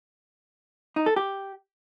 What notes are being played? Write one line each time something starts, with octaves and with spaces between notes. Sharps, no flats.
D#4
A4
G4